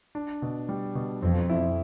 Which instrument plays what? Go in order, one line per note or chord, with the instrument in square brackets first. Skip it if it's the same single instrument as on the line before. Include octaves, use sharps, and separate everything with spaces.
[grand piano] D4
B2
G3
B2
[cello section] F2 [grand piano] C4
[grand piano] E4